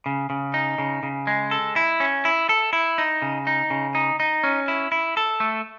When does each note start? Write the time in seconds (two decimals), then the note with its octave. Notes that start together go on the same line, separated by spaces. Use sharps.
0.06 C#3
0.30 C#3
0.54 D#4
0.78 C#3
1.03 C#3
1.27 G#3
1.51 A4
1.76 E4
2.00 C#4
2.25 E4
2.49 A4
2.73 E4
2.98 D#4
3.22 C#3
3.47 D#4
3.70 C#3
3.95 D#4
4.20 D#4
4.43 C#4
4.68 E4
4.92 E4
5.17 A4
5.40 A3